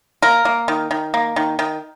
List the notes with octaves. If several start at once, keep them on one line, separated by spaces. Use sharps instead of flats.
A#3 A#4
A#3
D#3
D#3
A#3
D#3
D#3